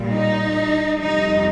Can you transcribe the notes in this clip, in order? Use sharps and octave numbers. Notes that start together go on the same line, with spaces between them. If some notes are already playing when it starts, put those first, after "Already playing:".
Already playing: A#2 G3
D#4
F2 C3 G3 D#4